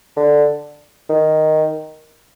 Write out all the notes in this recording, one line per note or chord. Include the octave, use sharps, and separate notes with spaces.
D3
D#3